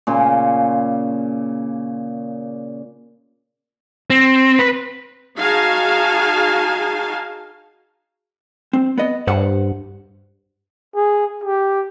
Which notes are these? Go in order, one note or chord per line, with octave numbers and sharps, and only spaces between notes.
A#2 C#3 C6
C4
B4
D#4 F#4 G#4 F5 G#5 A5
C4
B3 B4 D#5
G2 B4 C5 F#5
G#4
G4